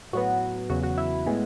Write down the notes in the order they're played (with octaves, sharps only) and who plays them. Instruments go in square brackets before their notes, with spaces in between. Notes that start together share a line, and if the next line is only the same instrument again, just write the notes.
[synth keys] A2 F#3 B3 F#4
E2 C#3 F#3 B3 F#4
F#4
E4
A2 G#3 B3